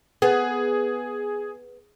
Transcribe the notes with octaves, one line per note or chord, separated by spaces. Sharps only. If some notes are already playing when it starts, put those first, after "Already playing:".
B3 G#4